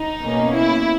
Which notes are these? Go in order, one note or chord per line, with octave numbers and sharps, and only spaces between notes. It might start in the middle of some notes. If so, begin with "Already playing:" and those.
Already playing: D#4
B2 A#3 C#4
E4